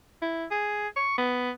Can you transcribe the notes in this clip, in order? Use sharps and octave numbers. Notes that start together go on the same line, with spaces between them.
E4
G#4
C#6
B3